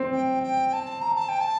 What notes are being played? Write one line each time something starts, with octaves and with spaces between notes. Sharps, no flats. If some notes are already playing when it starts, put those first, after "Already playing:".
Already playing: C4
G5
G5
A5
A#5
A5
G5
A5